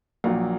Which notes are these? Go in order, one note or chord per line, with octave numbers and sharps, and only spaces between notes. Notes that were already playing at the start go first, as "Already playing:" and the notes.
A#1 A#2 F#3